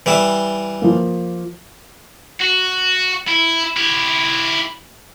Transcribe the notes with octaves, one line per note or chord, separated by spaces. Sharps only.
E3 G3 E5
F3 A#3
F#4
E4
E4 G4